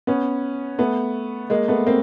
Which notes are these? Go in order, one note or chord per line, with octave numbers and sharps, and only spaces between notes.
B3 C#4
A3 B3
G#3 A#3
A3 B3
A#3 C4